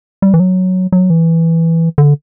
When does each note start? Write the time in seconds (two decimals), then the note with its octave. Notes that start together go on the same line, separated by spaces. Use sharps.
0.22 G3
0.34 E3
0.40 F#3
0.92 F#3
1.10 E3
1.98 D3